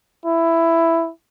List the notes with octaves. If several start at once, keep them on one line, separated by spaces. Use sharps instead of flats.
E4